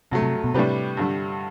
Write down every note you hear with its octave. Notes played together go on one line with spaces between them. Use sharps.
G2 C3 F#3 A3
C3
B2
A2 C3 G3 D4 G4 B4
G2 D3 G3